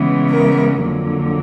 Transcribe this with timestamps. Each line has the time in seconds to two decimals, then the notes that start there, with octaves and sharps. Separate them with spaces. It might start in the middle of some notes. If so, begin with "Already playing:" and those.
Already playing: C#3 E3 G#3 B3
0.29 A#4
0.82 F2 D3 F#3 A#3